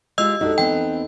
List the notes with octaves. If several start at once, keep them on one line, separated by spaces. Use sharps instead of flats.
G#3 F4 G4 D#5 E6
D4 D#4 F#4 G4 A4
E2 B3 C4 G5